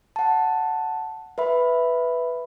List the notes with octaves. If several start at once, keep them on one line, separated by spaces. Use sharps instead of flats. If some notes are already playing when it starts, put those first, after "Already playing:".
F#5 A5
B4 E5 B5